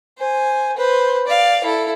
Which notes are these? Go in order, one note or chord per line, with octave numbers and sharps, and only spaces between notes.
C5 G#5
B4 C5
D5 F5
E4 A4